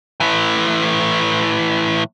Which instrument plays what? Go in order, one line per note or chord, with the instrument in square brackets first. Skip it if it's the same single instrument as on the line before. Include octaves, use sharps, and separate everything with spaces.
[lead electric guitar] A2 E3